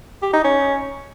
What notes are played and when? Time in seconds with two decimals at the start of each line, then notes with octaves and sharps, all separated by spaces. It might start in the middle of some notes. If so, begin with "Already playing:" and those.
0.22 G4
0.33 D#4
0.44 C#4